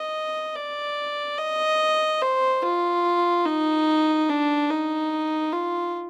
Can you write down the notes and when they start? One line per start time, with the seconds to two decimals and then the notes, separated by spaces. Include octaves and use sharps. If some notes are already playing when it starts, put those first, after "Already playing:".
Already playing: D#5
0.56 D5
1.38 D#5
2.22 C5
2.63 F4
3.45 D#4
4.29 D4
4.70 D#4
5.53 F4